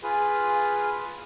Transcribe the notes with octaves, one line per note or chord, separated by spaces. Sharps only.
F4 G#4 B4